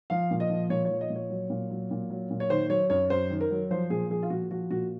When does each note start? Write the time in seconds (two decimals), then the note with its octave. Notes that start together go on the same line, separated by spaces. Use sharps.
0.10 F3 F5
0.31 A#2
0.40 D#5
0.50 F3
0.70 A#2 C#5
0.85 C#5
0.90 F3
1.01 D#5
1.10 A#2
1.16 C#5
1.30 F#3
1.50 A#2
1.71 F#3
1.91 A#2
2.10 F#3
2.31 A#2
2.40 C#5
2.50 D#3 C5
2.70 F#3 C#5
2.90 F#2 C#5
3.10 F#2 C5
3.30 D#3
3.41 A#4
3.51 F#3
3.71 F3 C5
3.90 A#2 G#4
4.10 F3 G#4
4.23 F4
4.30 A#2 F#4
4.51 F3 F#4
4.70 A#2 F#4